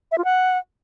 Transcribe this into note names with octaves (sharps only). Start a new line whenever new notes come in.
E5
F4
F#5